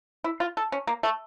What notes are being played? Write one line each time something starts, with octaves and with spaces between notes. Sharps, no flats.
E4
F4
A4
C#4
A#3
A3